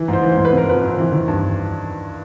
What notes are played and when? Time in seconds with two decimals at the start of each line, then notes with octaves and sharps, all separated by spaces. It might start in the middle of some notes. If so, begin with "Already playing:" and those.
Already playing: E3
0.08 G#2 C5
0.22 E3
0.32 C5
0.37 G#2
0.45 B4
0.53 C3
0.58 A#4
0.68 F2 B4
0.83 F2
0.98 E3
1.12 D#3
1.28 G2